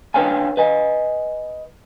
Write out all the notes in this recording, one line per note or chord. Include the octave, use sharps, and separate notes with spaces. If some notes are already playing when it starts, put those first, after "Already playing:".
D4 B4 C#5 F5 G5 G#5
B4 D#5 G#5